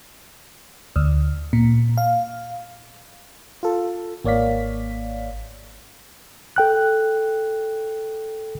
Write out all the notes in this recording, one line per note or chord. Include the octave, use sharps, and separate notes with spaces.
D2
A#2
F5
F4 A4
G#1 A#3 C#5 D5 F5 B6
A4 G5 F#6